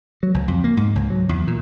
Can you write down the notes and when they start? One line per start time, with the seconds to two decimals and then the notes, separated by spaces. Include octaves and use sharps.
0.23 F#3
0.34 C#2
0.48 F2
0.64 A#3
0.77 G#2
0.95 C#2
1.10 F#3
1.29 E2
1.47 A#2